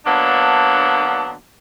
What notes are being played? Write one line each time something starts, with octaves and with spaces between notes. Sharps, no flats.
D3 F#3 A#3 B3 D4